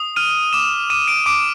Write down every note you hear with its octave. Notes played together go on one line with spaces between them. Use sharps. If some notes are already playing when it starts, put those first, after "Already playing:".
Already playing: D#6
F6 D#7
D6 E7
D6 D#7
D7
D6 D7